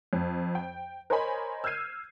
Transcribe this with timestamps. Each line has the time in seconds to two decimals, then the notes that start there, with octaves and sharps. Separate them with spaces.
0.13 F2
0.55 G5
1.10 A#4 C5 C#5 D#5 G#5 B5
1.64 E6 F6 G6 G#6 C7 D#7